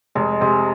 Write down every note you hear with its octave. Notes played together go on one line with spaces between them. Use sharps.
F1 G#3
C3 G#3